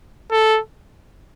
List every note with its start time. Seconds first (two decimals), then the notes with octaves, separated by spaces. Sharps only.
0.32 A4